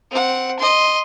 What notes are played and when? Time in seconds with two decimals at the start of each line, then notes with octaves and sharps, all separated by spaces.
0.11 C4 F#5
0.59 D#5 C6